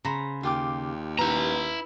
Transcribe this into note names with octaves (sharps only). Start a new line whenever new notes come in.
C#3 C5 A#5 B5
D#2 F4 G4 D6
E4 B4 A#5